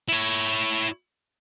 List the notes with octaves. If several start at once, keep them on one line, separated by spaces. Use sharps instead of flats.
E4 C#5